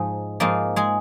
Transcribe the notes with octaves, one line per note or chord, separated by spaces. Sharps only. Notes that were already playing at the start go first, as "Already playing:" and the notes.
Already playing: G#2 F3 G#3 D#4
G#2 F3 G#3 A#3 D#4 A#4
G#3 G#4